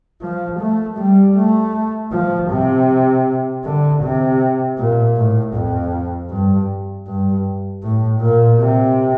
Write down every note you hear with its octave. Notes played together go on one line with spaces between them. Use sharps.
F3
A3
G3
A3
F3
C3
D3
C3
A#2
A2
F2
G2
G2
A2
A#2
C3